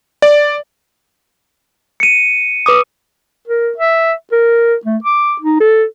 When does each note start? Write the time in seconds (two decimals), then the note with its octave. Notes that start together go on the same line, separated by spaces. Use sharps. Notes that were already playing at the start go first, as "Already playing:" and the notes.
0.22 D5
2.00 C#7 D#7
2.66 B4 D6 D#6
3.48 A#4
3.77 E5
4.32 A#4
4.85 A3
5.04 D6
5.41 D#4
5.60 A4